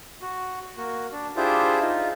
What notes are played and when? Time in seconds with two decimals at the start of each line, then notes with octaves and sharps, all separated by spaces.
0.22 F#4
0.77 A#3 F#4
1.12 D4
1.37 D4 E4 F4 G4 G#4 C5
1.80 D#4 F4